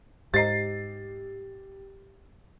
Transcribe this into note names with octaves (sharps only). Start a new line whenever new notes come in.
G#2 G4 C5 D#5 A#5 A6 C7